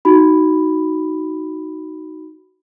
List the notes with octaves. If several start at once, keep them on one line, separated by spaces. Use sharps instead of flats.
D#4 F#4 B5